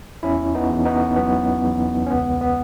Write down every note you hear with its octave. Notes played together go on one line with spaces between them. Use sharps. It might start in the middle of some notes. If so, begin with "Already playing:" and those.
E2 C#4 E4
B3 D#4
E2
B3 D#4
F#3 B3
E2
C#4
C#2 B3
B3